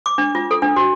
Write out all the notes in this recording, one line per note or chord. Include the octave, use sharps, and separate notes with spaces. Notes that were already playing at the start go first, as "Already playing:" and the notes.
D6
D4
F4
A4
D4
F#4